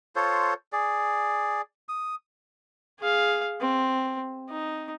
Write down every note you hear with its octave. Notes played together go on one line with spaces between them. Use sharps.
F4 A4 C5 C#5
G#4 D5
D#6
G#4 F5
C4
D#4